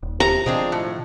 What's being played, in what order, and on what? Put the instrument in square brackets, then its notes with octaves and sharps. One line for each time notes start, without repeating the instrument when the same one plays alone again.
[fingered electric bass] D#1
[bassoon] C3 [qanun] A#5
[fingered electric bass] B2 D#3 [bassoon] F3 [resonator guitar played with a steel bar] G#3 C4 D4
[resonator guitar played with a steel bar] A2